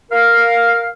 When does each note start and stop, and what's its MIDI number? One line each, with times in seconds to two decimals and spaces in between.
0.12 0.89 70
0.12 0.89 77